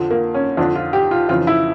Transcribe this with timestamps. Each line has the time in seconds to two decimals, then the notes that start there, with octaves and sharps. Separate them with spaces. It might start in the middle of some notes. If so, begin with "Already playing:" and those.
Already playing: F2 D3 F3
0.10 A#3
0.34 C#4
0.57 F2 D3 F3 D4
0.75 F4
0.93 G4
1.11 F4
1.29 F2 C#3 E3 F4
1.47 E4